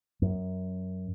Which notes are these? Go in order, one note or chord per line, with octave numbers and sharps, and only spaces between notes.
F#2